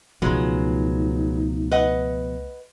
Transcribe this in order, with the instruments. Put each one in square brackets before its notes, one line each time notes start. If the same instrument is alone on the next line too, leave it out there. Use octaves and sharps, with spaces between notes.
[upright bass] C#2 A3 [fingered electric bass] B2 F3 [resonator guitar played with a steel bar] F#3 G#3 B3 [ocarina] D#4
[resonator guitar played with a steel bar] B4 D#5 F#5